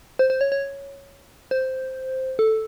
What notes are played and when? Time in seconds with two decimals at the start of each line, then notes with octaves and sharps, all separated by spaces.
0.19 C5
0.30 C5
0.41 C#5
0.52 C#5
1.51 C5
2.39 A4